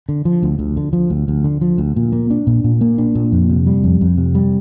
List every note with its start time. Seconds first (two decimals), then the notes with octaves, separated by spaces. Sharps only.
0.09 D3
0.25 F3
0.43 D2
0.59 D2
0.77 D3
0.93 F3
1.10 D2
1.28 D2
1.44 D3
1.61 F3
1.78 D2
1.96 A#2
2.12 A#3
2.30 D4
2.47 A#2
2.64 A#2
2.81 A#3
2.98 D4
3.15 A#2
3.32 F2
3.50 C3
3.67 G3
3.84 F2
4.01 F2
4.18 C3
4.35 G3